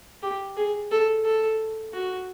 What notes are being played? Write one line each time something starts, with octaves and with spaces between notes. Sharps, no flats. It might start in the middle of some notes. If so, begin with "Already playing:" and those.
G4
G#4
A4
A4
F#4